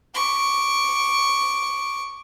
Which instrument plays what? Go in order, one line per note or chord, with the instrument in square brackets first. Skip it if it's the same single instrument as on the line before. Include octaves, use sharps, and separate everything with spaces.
[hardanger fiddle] C#6 D6